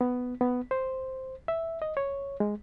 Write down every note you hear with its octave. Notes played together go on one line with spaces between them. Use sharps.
B3
B3
C5
E5
D#5
C#5
G#3